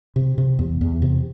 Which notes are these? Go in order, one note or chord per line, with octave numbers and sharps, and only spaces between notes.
C3
C3
E2
E2
C3